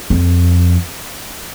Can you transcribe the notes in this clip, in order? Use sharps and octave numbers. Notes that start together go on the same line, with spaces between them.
F2